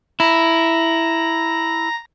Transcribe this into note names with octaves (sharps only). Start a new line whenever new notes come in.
E4 A#5 A#6